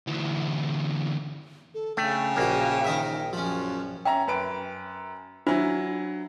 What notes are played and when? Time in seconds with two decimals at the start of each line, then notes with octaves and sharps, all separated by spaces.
0.07 D2 E3
1.74 A4
1.97 C#3 A3 D4 G5
2.36 A#1 A#3 D4 F#4
2.85 D#3 D#5 E5
3.33 F#2 F3 C#4
4.05 C#4 E5 G5 A#5
4.28 F#2 B4 D7
5.47 F#3 D4 E4 F4 C5